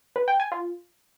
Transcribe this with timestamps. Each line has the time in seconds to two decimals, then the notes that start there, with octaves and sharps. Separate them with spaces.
0.16 B4
0.28 G5
0.40 G#5
0.52 F4